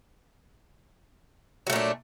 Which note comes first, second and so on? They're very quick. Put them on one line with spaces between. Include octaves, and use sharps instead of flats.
F#3 A3 A#2 D4